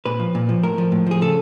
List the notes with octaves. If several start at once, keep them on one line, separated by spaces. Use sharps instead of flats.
A#2 B4
F3
A#2
F3
A2 A#4
F3
A2
F3 G#4
C#3 A4